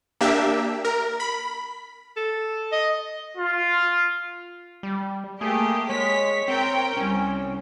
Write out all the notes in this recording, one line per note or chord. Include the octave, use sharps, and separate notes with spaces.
A#3 D4 G4 E5
A#4
B5
A4
D#5
F4
G3
A3 A#3 G4 G#4
G#3 C#5 B6
C4 A#4 G5
C2 C#4